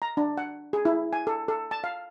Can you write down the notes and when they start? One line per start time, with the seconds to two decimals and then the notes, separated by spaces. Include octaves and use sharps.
0.02 A#5
0.17 D4
0.38 F#5
0.73 G#4
0.85 E4
1.13 G#5
1.27 A4
1.48 A4
1.71 A5
1.84 F5